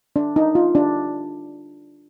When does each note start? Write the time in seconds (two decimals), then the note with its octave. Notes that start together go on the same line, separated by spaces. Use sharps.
0.16 D4
0.36 D#4
0.55 F4
0.75 D4